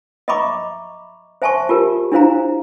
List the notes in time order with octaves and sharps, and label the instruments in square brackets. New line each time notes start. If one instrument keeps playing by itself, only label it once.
[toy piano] D#5 E5 A#5 B5 C#6 D6
C5 E5 G#5 A5 C6 C#6
F4 G4 A#4
D4 E4 C5 F5 A#5